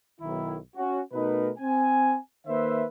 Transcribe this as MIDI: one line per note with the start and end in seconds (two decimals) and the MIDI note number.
0.21 0.57 35
0.21 0.57 51
0.21 0.57 64
0.76 1.00 61
0.76 1.00 66
1.13 1.49 47
1.13 1.49 57
1.13 1.49 63
1.13 1.49 70
1.13 1.49 71
1.58 2.17 60
1.58 2.17 80
2.46 2.84 51
2.46 2.84 58
2.46 2.84 71
2.46 2.84 72
2.46 2.84 76